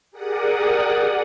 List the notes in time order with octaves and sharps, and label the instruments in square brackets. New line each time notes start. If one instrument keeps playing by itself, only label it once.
[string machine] G4 G#4 A#4 D5 F#5 D#6